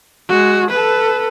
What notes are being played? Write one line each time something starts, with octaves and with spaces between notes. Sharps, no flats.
G#3 F#4
A4 B4